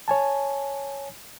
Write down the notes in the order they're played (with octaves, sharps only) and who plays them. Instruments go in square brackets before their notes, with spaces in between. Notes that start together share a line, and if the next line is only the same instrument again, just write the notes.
[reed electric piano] C#5 G#5 A5